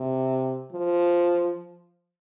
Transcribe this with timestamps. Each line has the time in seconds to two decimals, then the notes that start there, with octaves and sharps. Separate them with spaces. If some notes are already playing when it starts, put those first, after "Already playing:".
Already playing: C3
0.72 F3